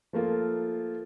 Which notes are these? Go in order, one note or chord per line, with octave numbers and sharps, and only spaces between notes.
F3 A3 A#3 F4